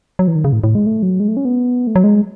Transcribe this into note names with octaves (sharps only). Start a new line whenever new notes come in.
F#3
E3
D#3
C#3
A2
A2
G#3
A3
F#3
G#3
A3
C#4
B3
A3
F#3
G#3